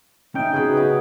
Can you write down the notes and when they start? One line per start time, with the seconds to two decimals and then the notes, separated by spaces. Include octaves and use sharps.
0.35 C#4 D#4 E5 G5 G#5
0.54 C#3 B3 F#4 G#4 B5
0.77 D#4